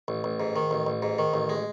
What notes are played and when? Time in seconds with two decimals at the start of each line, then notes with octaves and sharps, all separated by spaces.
0.08 A1
0.24 A1
0.40 G#2
0.56 D#3
0.71 A1
0.87 A1
1.02 G#2
1.19 D#3
1.34 A1
1.49 G#3